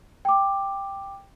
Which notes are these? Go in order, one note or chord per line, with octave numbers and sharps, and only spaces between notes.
G5 D6